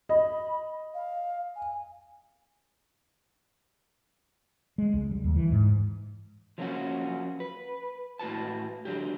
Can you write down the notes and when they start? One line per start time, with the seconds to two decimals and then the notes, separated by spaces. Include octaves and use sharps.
0.09 D#5 B5
0.94 F5
1.55 G#5
4.78 G#3
4.94 C#2
5.11 G3
5.24 D#2
5.36 E3
5.52 G#2
6.58 F3 F#3 A#3 C4 C#4 F#4
7.40 B4
8.19 A2 E4 F#4 B4 A5
8.85 D3 F#3 G4